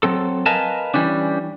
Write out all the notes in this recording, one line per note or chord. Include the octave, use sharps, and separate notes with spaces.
F#3 C4 A4
A#4 B4 D#5 F5 G#5 A5
E3 G3 C#4 D4